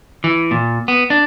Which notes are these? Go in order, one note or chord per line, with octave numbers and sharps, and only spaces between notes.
E3
A#2
B3
D4